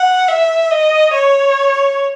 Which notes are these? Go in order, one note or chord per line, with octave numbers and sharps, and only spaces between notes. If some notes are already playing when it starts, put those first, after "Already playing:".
Already playing: F#5
E5
D#5
C#5